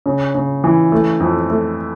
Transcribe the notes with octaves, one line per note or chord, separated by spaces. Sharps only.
C#3
C#3
E3
A3
F2
A3